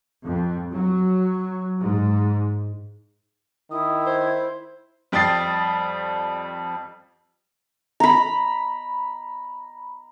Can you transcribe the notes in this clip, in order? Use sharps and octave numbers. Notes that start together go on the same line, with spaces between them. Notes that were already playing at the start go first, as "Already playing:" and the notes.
F2
F#3
G#2
D#3 E4 D#6
C5 G#6
F2 G3 G5 D#6 A6 C7
A#5 B5